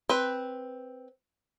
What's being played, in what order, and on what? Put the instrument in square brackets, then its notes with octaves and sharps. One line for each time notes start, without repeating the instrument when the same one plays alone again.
[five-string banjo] C4 B4